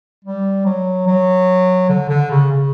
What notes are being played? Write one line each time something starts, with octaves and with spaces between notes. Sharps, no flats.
G3
F#3
F#3
D3
D3
C#3
C#3